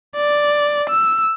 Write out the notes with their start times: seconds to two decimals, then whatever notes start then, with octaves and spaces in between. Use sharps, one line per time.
0.16 D5
0.90 E6